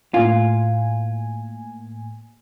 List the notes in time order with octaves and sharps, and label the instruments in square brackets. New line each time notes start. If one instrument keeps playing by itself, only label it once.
[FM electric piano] A2 A#3 G#5 [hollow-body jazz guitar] F4